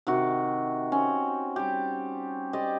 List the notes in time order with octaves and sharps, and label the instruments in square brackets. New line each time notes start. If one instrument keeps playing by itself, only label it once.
[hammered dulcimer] C3 D#3 F#4 D6
C4 C#4
G3 G4
G4 C5 D5 D#5